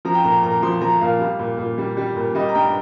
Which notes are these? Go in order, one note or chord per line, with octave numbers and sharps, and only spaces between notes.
F3 A#5
G5
A#2 A#5
A#2 A#5
F3 C6
F3 A#5
A#2 F5
G3
A#2
A#2
G3
G3
A#2
G3 D#5
A#5
G2 G5